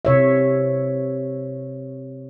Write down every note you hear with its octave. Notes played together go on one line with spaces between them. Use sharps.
C3 C#5 E5